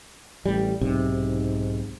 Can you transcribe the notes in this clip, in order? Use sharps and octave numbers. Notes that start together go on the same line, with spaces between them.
A1 G3
B1 G#2 C3